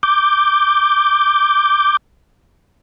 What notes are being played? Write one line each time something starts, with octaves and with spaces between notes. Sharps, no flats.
D6 G6